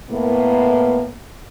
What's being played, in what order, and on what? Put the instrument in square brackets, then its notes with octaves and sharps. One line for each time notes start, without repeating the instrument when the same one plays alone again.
[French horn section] A2 A#3 B3